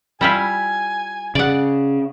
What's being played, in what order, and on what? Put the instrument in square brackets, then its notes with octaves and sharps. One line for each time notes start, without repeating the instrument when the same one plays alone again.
[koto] G3 E4 F4 [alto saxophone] G#5
[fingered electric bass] C#3 [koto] D5 F#5